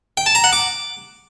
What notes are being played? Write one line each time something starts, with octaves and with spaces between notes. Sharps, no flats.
G5
A5
A#5
F#5
D6